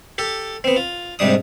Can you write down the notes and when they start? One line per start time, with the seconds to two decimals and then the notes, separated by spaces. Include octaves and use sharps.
0.18 G4 A4
0.64 B3 C4
0.76 F4
1.19 G#2 C3 G3 D4 D#6